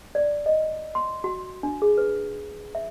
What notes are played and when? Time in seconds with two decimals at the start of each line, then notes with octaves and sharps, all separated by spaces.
0.15 D5
0.46 D#5
0.95 C6
1.24 F#4
1.63 D4
1.82 G#4
1.98 B4
2.75 E5